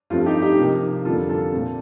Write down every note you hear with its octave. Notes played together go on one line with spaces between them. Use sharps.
G2 F3 A3 C4 F4
D#4 G4
D#4 G4
C3 F3 A#3
F2 D3 G3 A#3 F4 A4
F4 A4
A#2 A3 C4